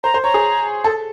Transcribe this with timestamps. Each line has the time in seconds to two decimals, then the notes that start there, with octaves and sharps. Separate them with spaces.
0.04 C5 A#5
0.14 C5
0.24 C#5 A#5
0.34 G#4
0.84 A4